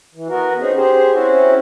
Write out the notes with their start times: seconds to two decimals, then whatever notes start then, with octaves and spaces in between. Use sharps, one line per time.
0.15 E3
0.29 B3 F#4 A#4
0.60 C4 C#4 D#4 G#4
0.76 G4 G#4 C5
1.12 C4 C#4 E4 F#4